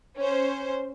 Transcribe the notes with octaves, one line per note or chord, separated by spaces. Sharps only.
C#4 C5